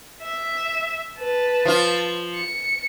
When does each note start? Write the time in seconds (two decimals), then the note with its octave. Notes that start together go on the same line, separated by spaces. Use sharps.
0.22 E5
1.19 B4 A5
1.65 F3 F4
2.36 C#7